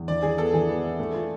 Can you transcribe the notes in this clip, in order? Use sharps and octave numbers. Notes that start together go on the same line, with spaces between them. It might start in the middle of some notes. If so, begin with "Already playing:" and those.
Already playing: E2
E3 D5
E3 G#4
B3 A4
E3 G#4
B3
E4
A3
F4